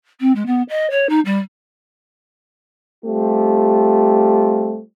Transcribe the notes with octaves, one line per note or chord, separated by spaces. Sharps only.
C4
G#3
B3
D#5
C#5
D#4
G3
G3 A3 C4 F4 G4